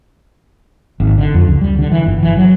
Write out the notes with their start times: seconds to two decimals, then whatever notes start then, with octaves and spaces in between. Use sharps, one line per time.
1.00 G#1
1.18 D3
1.34 F2
1.47 C#2
1.61 G3
1.79 D3
1.92 E3
2.06 G1
2.23 E3
2.37 F#3